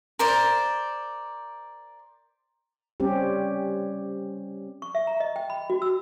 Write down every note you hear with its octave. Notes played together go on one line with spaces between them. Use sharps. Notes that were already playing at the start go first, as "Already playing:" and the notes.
A#4 C5 D5
G3 C4 C#4 G4
C#6
E5
A#5
D#5
G5
B5
F#4
E6